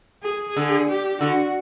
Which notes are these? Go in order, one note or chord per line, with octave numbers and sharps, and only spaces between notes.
G#4
D3
G4
D3 F#4